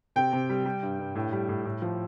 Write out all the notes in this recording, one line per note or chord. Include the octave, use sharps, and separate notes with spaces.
C3 G5
C3
G3
G3
G2
G2
A2
G3
A2
A2
F3